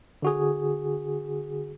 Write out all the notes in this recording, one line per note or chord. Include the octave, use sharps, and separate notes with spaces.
D3 F#4 G#4